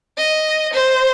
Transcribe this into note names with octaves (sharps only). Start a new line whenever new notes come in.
D#5
C5